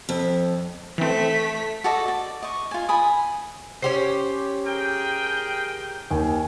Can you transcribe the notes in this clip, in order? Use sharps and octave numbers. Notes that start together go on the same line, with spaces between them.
F2
E3 A3 C4 B6
F#4 A4 D5 D#5
D5
D#5 C#6
F4 G#5
G#5 B5 D#6
C#4 G4 C5 C7
G#4 A#4 G5
D#2 G#5